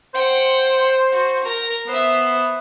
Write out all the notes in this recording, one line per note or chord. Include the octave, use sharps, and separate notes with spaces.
C5 F#5 G5
F#4
A#4 A#5
B3 C5 E5